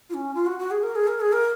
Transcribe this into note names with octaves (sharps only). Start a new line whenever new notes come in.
F4
C#4
F4
F#4
F#4
G#4
A#4
G#4
A#4
G#4
A#4